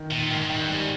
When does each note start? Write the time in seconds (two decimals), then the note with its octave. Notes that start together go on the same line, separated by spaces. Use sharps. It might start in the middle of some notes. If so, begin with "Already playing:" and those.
Already playing: D#3
0.11 A#2 D#3
0.31 G#2 D#3
0.50 G2 D#3
0.69 G#2 G3